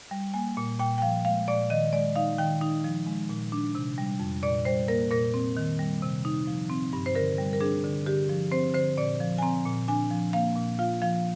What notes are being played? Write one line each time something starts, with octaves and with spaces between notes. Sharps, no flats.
G3
A#3 G#5
A#2
A#2 G5
G5
F3 F5
G#3 F5
A#2 D5
D#3 D#5
G#3 D5
D#4 F5
D#3 G5
D#4
F3
G#3
A#2
D4
C3
G3
F2
A#2 D5
G3 C5
A#3 A#4
A#2 A#4
C4
D#3
G3
C3
D#4
F3
C4
G2
C5
D3 A#4
G3
A#4
D4 G#4
D3
D3 G4
F3
C4 C5
D3 C5
A#2 D5
F3
G#5
C4 A#5
A#2
D4 G#5
F3
A#3 F5
A#2
F4 F5
F3 F5